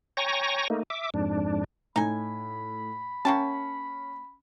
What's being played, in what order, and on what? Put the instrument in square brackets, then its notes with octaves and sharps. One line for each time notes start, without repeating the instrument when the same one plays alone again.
[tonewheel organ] C#5 G5 G#5 A#5 C#6 A#6
A3 A#3 D#4
E5 D6
F2 G#2 D4
[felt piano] A2 [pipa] D#4 G#5 [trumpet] B5
[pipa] A#3 G5 A5 [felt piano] C#4 C#6